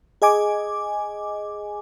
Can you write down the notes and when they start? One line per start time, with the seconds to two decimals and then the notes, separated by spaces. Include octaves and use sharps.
0.22 G#4 D#5 G#5 D6